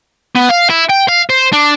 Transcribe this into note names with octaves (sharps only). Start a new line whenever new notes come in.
B3
F5
E4
G5
F5
C5
D4